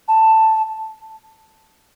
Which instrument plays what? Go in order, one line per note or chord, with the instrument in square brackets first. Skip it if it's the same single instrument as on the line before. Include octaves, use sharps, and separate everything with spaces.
[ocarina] A5